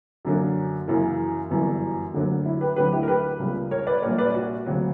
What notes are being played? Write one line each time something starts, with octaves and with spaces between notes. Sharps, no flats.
F#2 D3 F#3 A#3
F#2 C#3 E3 A#3
G1 F#2 E3 G3
D2 D3 F#3 A#3
E4
G4 B4
D2 D3 F#3 G4 B4
E4 G4
A#4
G4 B4
C#2 C#3 G3 A#3
A#4 C#5
B4 D5
A#1 A#2 G3 A#3 A#4 C#5
B4 D5
F#4
D2 C#3 F#3